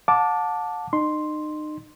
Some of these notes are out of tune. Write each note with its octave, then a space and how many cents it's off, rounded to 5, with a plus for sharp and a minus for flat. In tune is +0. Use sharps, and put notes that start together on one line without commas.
F#5 -45 A5 +0 D6 +0
D#4 -35 C6 +0